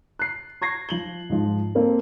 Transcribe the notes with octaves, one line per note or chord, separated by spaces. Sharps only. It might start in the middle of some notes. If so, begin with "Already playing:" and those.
F#6 C7
C#6 G#6 A#6 C7
F3 F#7 G7
G#2 F3
A#3 C4 F4 A4 A#4